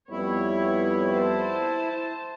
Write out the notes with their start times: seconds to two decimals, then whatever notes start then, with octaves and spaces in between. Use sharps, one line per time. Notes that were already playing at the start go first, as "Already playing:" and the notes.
0.11 F2 G3 B3 E4 C#5
1.10 C5 A5